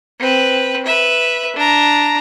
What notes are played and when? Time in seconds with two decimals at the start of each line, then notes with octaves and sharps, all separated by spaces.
0.19 C4 B4
0.86 B4 E5
1.56 D4 A#5